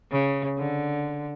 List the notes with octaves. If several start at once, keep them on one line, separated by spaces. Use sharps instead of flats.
C#3
D3